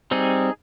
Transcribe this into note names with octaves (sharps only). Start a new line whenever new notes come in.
G3 C4 D#4 G#4